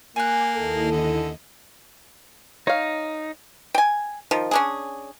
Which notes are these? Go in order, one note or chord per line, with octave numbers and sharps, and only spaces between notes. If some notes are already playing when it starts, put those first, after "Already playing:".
A#3 G5 G#5 D6 F#6 G#6
D#2 E4 A4 D#5
D3
D#4 C#5 F5
G5 G#5
D#3 F3
C#4 D4 G#4